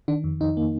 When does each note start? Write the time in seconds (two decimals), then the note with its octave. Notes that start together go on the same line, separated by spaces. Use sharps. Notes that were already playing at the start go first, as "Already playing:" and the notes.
0.08 D#3 D4
0.24 F2
0.41 F2 D#4
0.57 A#3